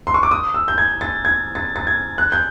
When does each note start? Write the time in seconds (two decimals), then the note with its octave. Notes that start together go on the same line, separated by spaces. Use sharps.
0.07 C6
0.14 C#6
0.23 D6
0.31 D#6
0.54 E6
0.68 G6
0.78 G#6
1.01 A6
1.25 G#6
1.55 A6
1.76 A6
1.87 G#6
2.18 F#6
2.32 G6